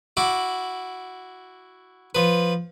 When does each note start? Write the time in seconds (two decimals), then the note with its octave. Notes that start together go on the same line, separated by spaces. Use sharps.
0.17 E4 F#4 D6
2.15 F3 B4